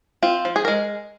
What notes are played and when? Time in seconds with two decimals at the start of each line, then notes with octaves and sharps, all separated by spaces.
0.23 C4 F4
0.45 F3
0.56 G#4
0.65 A#4
0.68 G#3